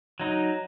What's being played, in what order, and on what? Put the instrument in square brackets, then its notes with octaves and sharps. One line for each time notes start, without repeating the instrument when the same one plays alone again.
[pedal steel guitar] F#3 D#4